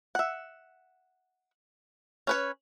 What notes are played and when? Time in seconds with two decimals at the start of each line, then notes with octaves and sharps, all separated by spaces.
0.15 E5 F#5
2.27 C#4 B4 C#5